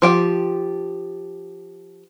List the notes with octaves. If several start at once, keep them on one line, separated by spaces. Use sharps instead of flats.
F3 G4 G5